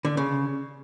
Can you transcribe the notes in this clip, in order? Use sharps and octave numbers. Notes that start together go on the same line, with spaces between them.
D3
C#3